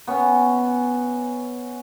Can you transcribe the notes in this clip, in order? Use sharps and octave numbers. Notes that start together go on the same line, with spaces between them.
B3 C#4